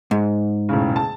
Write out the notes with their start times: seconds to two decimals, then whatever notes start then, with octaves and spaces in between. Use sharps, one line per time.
0.11 G#2
0.69 E1 A2 C#3
0.96 A5